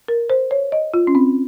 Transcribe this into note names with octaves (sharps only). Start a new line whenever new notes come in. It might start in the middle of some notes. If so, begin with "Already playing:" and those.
A#4
C5
C#5
D#5
F4
C#4
C4